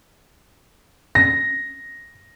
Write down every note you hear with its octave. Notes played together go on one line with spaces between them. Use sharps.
A#6